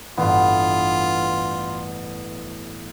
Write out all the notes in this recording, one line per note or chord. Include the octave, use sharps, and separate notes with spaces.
A1 G2 B3 F4